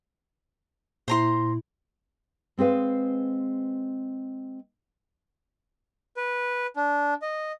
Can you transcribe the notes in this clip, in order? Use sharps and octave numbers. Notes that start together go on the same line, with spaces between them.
A#2 E4 C5 A#5 C6
G#3 C4 G#4 B4 F5
B4
D4
D#5